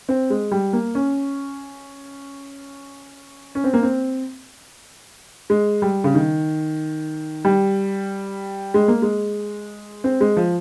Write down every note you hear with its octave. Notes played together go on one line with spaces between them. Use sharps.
C4
G#3
G3
A#3
C#4
C#4
C4
A#3
C4
G#3
G3
C#3
D#3
G3
G#3
A#3
G#3
C4
G#3
F3